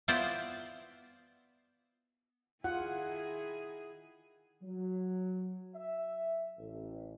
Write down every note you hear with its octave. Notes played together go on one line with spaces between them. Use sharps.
B3 E4 F4 C5 D5
D#3 E4 F4 G#4 F#5
F#3
E5
A1